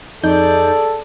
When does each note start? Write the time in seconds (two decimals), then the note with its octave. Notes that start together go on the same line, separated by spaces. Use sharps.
0.24 F2 D#4 G#4 A4 D5 G6